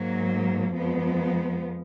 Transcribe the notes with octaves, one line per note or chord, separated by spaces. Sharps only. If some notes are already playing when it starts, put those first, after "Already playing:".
Already playing: G#2 F#3 A#3
F2 F3 G#3 B3